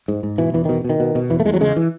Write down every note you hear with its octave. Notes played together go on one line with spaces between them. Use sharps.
G#2
G#2
B2 E3
E2 E3
B2 D#3
B2
D#3
B2
B2
E2 E3
A3
E2 G#3
F#3
C#3 G#3
E3